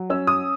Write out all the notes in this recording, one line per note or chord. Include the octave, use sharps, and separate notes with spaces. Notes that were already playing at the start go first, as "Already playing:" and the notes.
Already playing: F#3
C#4 E6
D#6